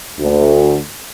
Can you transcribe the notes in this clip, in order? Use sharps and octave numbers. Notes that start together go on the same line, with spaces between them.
D2